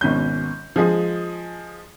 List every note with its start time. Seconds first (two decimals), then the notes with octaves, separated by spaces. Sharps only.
0.01 G#1 B2 C#4 G6
0.76 F3 G#3 G#4